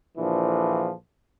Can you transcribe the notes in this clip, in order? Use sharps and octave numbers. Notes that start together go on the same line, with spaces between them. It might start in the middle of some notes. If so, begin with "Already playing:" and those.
A#1 A#2 D3 E3 F3